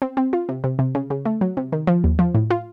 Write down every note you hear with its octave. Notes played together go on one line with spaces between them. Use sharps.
C4
C4
F4
C3
C3
C3
C#3
C#3
A3
F#3
C3
D#3
F3
D#2
F3
A2
F4